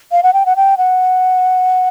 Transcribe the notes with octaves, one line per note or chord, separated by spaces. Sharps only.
F5
F#5
G5
F#5
G5
F#5